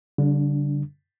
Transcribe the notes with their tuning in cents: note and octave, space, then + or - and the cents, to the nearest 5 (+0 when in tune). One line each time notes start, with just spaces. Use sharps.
D3 -40 G3 -10 D4 +0